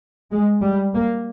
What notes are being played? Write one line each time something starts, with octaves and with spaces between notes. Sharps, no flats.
G#3
G3
A#3